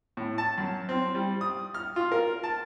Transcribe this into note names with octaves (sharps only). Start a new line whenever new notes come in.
A2
A5
F#2
C4
G3
D#6
F6
F4
A#4
A5